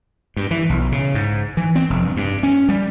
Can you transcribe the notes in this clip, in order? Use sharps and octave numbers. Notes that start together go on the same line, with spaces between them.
G2
E3
B1
C#3
G#2
E3
C4
F1
G2
G2
C#4
G3